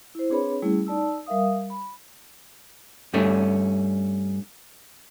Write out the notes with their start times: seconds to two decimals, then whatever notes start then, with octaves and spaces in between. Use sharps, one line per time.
0.15 E4 C5
0.30 C4 D4 G#4 B4 C#5 B5
0.62 G3 A3 C#4 E4 G#4
0.87 D#4 D5 A5 E6
1.26 G3 A#4 E5 F5 D#6
1.70 B5
3.14 G2 A3 C#4